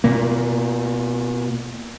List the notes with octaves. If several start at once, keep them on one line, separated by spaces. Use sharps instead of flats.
B2 A#3